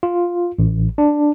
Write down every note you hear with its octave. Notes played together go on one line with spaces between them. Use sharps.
F4
A1
D4